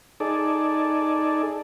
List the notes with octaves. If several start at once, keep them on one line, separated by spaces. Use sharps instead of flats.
D#4 G#4 A4 D5